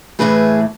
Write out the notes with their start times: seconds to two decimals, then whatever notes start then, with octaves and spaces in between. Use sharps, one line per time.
0.19 A2 E3 A3 G#4 B4